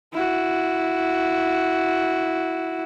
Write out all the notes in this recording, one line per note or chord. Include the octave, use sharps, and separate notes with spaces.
E4 F#4